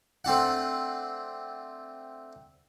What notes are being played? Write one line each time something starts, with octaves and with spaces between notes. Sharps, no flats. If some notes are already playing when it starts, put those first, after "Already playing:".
A3 C4 D4 F#5